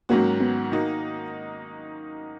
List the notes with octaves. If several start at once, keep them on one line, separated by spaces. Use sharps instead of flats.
G#2 D#3 F#3 A#3 C#4 F#4
B3
D#3 A#3 D#4 F#4